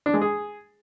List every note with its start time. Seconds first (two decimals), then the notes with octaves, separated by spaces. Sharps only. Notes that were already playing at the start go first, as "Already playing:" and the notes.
0.06 D4
0.14 G#3
0.21 G#4